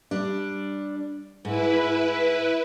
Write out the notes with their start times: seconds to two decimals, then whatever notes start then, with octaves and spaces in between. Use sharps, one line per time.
0.11 G3 D4
1.45 G#2 E4 B4